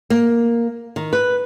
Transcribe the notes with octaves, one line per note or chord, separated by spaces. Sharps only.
A#3
D#3
B4